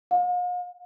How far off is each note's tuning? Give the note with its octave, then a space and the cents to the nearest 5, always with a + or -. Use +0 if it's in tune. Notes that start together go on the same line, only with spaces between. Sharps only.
F5 +45